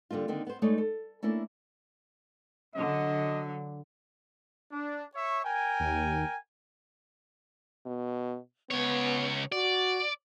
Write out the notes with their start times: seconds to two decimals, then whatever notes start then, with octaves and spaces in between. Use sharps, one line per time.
0.11 D3 G3 A#3 F4
0.28 D3 D#3 A#3 C4
0.47 B3 C5
0.62 G#3 A3 D#4 C#5 D5
0.78 A4
1.23 A3 A#3 C#4 D4 E4 A4
2.75 D3 F#3 D#5
4.71 D4
5.15 C#5 E5 C#6
5.44 A#4 G5 G#5
5.80 D#2
7.86 B2
8.70 C#2 B3 C#5
9.52 F#4 D5